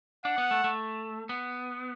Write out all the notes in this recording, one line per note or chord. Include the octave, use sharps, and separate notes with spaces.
D4 F#5
B3
A3
A3
B3